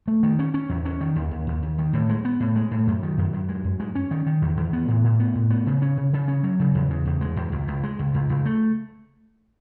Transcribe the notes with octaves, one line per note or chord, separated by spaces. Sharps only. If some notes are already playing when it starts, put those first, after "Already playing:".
A3
D#3
C#4
C#4
E2
C#4
D#3
D#2
D#2
D#2
D#2
D#3
A2
G#3
B3
A2
G#3
A2
F#2
D#3
F#2
F#2
G#3
F#2
G#3
C#4
D#3
D#3
E2
E2
B3
A2
A2
B3
A2
B3
C#3
C#4
C#3
C#3
C#4
F#3
C#3
E2
C#3
E2
G#3
E2
C#2
C#2
G#3
C#2
C#2
C#2
A3